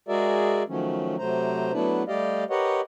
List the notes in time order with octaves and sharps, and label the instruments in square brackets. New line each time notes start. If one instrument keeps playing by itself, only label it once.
[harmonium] G#3 F#4 G#4 A#4 D5 E5
D#3 F3 F#3 A3 C#4
C3 F#3 A3 C5 A#5
F#3 A3 B3 D4 E4 B4
G3 A3 G4 D5 D#5 F5
G4 A#4 B4 C#5 D#5 F#5